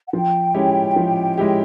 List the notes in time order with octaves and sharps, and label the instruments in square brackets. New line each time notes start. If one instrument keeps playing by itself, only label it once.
[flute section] F#5
[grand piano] F3 [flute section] G5
[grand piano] G#3 C#4 E4 G4
F3
G#3 C#4 E4 G4